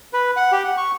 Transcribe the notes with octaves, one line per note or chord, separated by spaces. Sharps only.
B4
F#5
G4
F#5
C#6